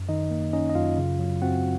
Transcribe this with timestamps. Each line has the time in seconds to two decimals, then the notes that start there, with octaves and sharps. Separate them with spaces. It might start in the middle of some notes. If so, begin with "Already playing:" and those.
Already playing: F#2
0.09 D#3 D#4 D#5
0.31 A#3
0.53 C#4 D#4 D#5
0.69 D#5
0.75 F#2 F4 F5
0.98 C#3
1.19 F#3
1.42 C4 F#4 F#5